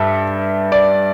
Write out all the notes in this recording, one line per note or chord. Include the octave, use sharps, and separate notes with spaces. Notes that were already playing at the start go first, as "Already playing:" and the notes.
Already playing: G2 A4 E5
D5